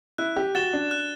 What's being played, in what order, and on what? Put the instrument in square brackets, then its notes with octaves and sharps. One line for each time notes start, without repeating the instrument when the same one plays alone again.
[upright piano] E4 [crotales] F#6
[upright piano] G4
[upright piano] F#4 [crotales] A6 E7 G7
[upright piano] D4
[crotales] F#6